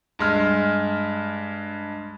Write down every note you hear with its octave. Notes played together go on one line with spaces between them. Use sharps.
G2 G#3 F6